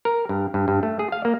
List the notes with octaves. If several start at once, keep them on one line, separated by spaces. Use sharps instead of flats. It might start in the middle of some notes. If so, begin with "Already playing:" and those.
A#4
G2
G2
G2
A3
G#4
F5
A#3